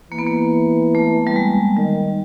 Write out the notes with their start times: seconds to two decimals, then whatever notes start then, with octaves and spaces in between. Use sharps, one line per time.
0.11 E3 A#3
0.18 B3
0.27 A#3
0.95 A3
1.27 G3
1.36 G#3
1.77 D#3 G3